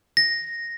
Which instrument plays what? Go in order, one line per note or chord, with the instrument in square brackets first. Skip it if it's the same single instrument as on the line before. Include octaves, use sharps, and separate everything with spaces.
[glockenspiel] A#6